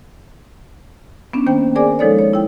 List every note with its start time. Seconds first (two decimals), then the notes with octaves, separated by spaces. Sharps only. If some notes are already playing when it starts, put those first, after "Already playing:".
1.33 B3 C#4 D4
1.46 D#3 A#3 C5 G5
1.75 G#4 A#4 C5 D5 G#5 D6
1.99 F3 G#3 D#4 A4 C#5 D5
2.19 C#5
2.33 E4 G5